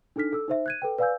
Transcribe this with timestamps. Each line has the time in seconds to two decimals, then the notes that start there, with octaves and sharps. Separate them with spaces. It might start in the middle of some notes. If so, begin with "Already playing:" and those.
0.16 D4 D#4 A4 F6 B6
0.33 A4 E6
0.48 D#4 C5 E5
0.66 F#6 G#6 D#7
0.82 A4 B4 G5
0.98 B4 D5 F5 G#5 E6 G6